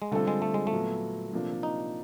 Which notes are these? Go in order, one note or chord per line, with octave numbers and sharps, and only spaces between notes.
G#3
D3 G3 A3 C4 F4 A4
G#3
A3
G#3
A3
A#2 F#3 B3
C3 F3 A#3 D4
D#4